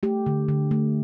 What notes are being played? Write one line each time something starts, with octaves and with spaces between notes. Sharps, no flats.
A3 G4
D3
D3
A3